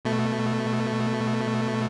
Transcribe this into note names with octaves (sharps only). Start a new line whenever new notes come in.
B2 A3